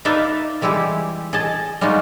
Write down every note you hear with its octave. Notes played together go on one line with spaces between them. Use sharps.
D#4 B4 D5 E5 F5
E3 G3 G#3 E4 G4
G#4 D#5 A5
G3 G#3 D#4 F4 F#4